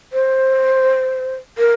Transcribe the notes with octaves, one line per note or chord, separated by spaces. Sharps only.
C5
A#4